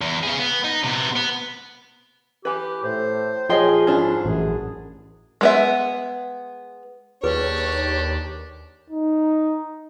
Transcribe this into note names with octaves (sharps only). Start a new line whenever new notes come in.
E2
C#3 G#4
B3
D#4
C3 B3
B3
E3 G4 B4
A2 C5
A#1 F3 G4 G#4 C#5 D#5 G5 C6
G#1 G#2 C#4 D4 E4
A1 F#2 G#4
G#3 B3 E5
D#2 D4 G4 G#4 B4 C#5 D6
D#4